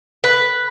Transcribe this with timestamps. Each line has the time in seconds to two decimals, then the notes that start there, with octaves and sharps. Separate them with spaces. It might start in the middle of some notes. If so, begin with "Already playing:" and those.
0.24 B4